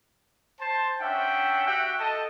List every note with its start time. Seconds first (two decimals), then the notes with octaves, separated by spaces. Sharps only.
0.60 C5 A5
1.00 C#4 D4 E5 F#5 G5
1.68 F#4 G4 E5 F#5 G5
1.99 A4 D#5 A5